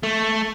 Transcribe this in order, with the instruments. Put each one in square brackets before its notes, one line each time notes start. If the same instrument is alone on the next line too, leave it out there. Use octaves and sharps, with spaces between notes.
[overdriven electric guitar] A3